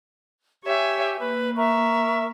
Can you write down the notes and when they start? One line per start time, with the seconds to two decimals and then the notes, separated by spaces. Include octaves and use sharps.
0.65 G4 C#5 E5 G#5
1.20 A#3 B4
1.56 A#4 E5 C#6